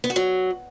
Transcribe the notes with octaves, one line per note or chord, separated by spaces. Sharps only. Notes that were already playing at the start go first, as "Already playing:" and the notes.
B3
F#4
F#3